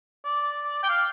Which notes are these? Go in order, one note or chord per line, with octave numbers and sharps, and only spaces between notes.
D5
G5
F5